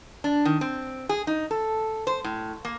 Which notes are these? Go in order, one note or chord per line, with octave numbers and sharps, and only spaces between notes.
D4
D#3
C4
G#4
D#4
A4
C5
A2
A#3